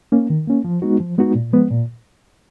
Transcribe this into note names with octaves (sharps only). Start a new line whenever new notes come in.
A#3 C#4
D#3
A#3 C#4
F3
G#3 B3 D#4 F#4
F3
G#3 B3 D#4 F#4
A#2
F3 G#3 B3
A#2